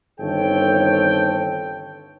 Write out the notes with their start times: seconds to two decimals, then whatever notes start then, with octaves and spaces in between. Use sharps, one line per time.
0.20 G1 D#3 C4 A4 C#5 G5